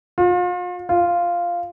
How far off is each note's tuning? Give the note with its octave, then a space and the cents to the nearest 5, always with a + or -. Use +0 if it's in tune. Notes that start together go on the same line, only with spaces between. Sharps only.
F4 +40
F4 -5